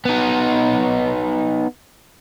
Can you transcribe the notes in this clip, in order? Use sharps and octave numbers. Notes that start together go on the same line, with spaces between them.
B3 D#4